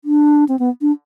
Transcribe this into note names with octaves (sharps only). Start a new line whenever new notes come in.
D4
C4
B3
D4